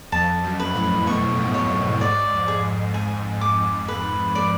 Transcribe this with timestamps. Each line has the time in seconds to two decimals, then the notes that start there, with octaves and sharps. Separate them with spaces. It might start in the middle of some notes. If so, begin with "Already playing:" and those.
0.12 F2 A5
0.44 F#2
0.60 B4
0.75 A2
1.06 B2 C#6
1.37 G#2
1.54 C#5
1.69 F#2
2.00 G#2 D5
2.32 F2
2.48 G#4
2.94 G#5
3.41 D6
3.88 B4
4.35 D5